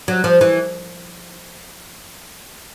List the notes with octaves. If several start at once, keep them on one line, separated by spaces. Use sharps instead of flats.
F#3
F3
E3